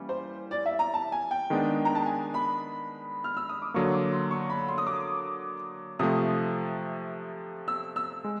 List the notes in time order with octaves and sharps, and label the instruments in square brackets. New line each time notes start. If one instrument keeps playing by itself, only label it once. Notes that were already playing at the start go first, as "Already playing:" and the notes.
Already playing: [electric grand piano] E3 G3 A#3 C#4
[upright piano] C5
D5
E5
A#5
A5
G#5
G5
[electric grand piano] D#3 G#3 B3 D4
[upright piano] A#5
A5
G#5
B5
F6
E6
D#6
D6
[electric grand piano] D3 F#3 A#3 [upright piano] C#6
[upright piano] D6
C6
C#6
B5
C6
D#6
D6
[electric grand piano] C3 F3 A3 [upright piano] D#6
[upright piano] E6
E6
[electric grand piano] G#3